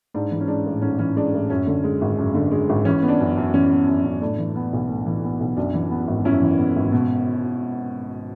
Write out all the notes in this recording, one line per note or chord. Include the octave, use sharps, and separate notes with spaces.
G#2 D4
E3
C#4
G#3 D4
A1
G#2 C#4
E3 C#4
G#3 D4
A1
F#2 C#4
D3
G#3
G#1
F#2
D3
G#3
G#1
E3 C#4
B3
D4
F#2
F#2
E3 C#4
B3
F#2
F#2
A2 D4
E3
B3
B1
A2
E3
B3
B1
F#2 D4
E3
B3
G#1
F#2 C#4 E4
E3
B3
G#1
B2